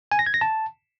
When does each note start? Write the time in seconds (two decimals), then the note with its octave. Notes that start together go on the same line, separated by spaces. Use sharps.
0.12 G#5
0.19 A#6
0.26 G#6
0.34 A#6
0.41 A5